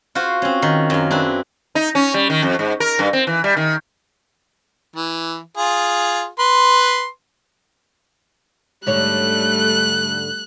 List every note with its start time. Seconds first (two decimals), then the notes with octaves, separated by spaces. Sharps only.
0.15 F4 F#4 C5
0.42 C4 C#4
0.62 D#3
0.90 F#2 F5
1.11 C4 D4 E4 B4
1.75 D#4
1.95 C#4
2.14 G3
2.30 D#3
2.42 F2
2.59 G#2
2.80 A#4
2.99 G2
3.13 C4
3.27 E3
3.44 G3
3.57 D#3
4.96 E3
5.57 F4 G#4
6.39 B4 C6
8.86 G#2 D3 G3 A3 C#5 F#6